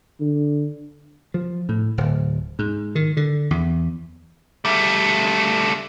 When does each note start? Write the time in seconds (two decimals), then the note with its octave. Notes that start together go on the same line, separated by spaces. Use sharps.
0.20 D3
1.34 F3
1.69 A2
1.98 D1
2.59 G#2
2.95 D#3
3.17 D3
3.51 E2
4.65 G3 A3